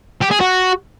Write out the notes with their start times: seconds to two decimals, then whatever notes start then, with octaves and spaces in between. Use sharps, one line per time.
0.22 G4
0.31 G#4
0.41 F#4